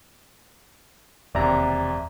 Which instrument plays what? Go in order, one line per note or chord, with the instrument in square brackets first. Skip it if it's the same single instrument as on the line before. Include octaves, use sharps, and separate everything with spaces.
[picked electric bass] E1 [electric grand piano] D#2 C3 [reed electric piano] D5 E5 A#5